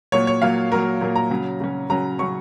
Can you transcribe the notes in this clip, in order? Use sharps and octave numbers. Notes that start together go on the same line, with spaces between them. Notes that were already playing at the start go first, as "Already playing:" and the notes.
A#2 F#3 A#3 C#5
C#5
A#2 F#3 A#3 F5
A#2 F#3 A#3 A#4
A#2 F#3 A#3
A#5
C#3 F#3 C#4
C#3 F#3 C#4
C#3 F#3 C#4 A#5
C#3 F#3 C#4 C#6